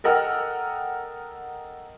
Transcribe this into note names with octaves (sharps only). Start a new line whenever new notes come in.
A4 A#4 D#5 F#5 G5 F6